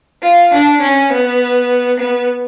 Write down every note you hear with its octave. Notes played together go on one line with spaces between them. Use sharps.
F4
D4
C#4
B3
B3